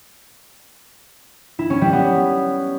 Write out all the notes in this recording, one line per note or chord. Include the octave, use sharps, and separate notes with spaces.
E4
C#4
G3
B3